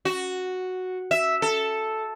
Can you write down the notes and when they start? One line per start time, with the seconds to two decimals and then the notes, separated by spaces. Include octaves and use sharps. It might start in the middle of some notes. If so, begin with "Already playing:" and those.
0.05 F#4
1.11 E5
1.42 A4